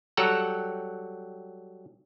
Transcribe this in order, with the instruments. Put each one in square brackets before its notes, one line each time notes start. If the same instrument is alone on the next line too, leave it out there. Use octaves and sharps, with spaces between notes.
[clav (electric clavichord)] F#3 G3 A4 F#5 G5 A#5